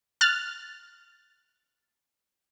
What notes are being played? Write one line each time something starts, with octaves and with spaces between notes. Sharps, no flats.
F6 F#6 A6